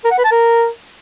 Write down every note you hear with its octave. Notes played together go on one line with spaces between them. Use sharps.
A#4
F#5
B4
A5
A#4